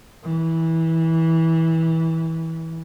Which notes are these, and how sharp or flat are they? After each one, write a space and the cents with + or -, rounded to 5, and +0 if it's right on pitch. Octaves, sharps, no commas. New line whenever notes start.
E3 -20